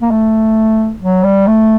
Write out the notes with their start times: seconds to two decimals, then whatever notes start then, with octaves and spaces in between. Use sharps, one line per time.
0.02 A#3
0.11 A3
1.02 F#3
1.24 G3
1.47 A3